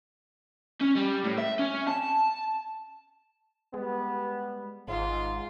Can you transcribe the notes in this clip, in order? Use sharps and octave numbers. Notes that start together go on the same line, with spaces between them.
C#4
G3
A2
E5
C#4
A5
G3 G#3 B3
G#1 G#2 F4